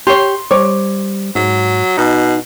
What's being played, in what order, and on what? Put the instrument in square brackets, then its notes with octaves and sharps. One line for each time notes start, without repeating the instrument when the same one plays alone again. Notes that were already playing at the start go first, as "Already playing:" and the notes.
[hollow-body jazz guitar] G4 C#5 [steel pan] C6
[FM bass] G3 [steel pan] C5 D6 [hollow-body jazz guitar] C#5
[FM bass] G#2 [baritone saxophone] F#3
[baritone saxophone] B2 [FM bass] D#4